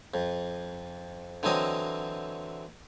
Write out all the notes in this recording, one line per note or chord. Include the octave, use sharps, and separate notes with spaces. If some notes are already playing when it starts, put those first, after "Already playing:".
F2
D3 E3 F#3 C4 D#5